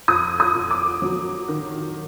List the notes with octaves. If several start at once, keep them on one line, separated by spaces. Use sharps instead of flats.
F2 D#6
D#6
F2
D6
F#3
D#3